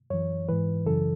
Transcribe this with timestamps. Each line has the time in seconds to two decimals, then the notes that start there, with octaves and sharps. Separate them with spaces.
0.10 F#2 E3 C#5
0.49 G#2 E3 B4
0.86 F#2 C#3 E3 A4